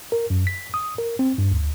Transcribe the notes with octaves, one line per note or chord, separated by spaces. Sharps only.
A#4
F#2
B6
D#6
A#4
C4
G2
D2